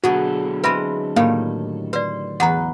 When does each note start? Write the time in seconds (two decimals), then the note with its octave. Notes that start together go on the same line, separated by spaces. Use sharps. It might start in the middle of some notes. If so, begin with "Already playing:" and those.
0.04 B2 D3 F#3 F#4 G#4 A4 F#5
0.64 G#3 C4 B4 E5 B5
1.16 A2 D#3 G3 A#3 F5
1.93 B4 C5 D5
2.40 E2 B4 F#5 A#5